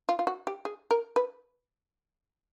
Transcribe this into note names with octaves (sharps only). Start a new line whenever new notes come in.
F4
F4
F#4
G4
G#4
A#4
B4